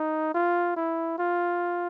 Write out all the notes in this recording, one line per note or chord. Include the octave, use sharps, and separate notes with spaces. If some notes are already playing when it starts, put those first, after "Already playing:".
Already playing: D#4
F4
E4
F4